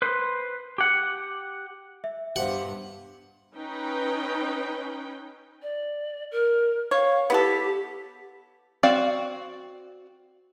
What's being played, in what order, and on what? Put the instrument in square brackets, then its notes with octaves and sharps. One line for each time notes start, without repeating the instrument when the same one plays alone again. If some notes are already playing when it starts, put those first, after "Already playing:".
[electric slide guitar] B4 C5
G4 F#5
[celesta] E5
[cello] G2 B3 [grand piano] G4 C5 F5 [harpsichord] F#5
[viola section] C#4 D#4 B4 G5
[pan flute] D5
A#4
[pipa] C#5 [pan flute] F5
[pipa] B3 E4 A4 [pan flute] G4
[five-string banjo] C4 F#4 D5 F5